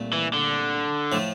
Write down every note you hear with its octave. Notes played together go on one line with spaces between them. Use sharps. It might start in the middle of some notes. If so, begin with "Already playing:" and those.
Already playing: C2 A#2 A3
E3
D3
A2 F3 A3